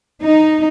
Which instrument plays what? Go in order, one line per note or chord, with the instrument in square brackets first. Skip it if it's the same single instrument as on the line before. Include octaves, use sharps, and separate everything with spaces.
[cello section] D#4